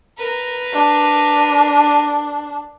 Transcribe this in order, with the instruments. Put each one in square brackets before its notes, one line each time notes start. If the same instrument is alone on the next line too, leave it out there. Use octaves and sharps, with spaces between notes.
[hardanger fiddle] A#4 B4
[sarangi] D4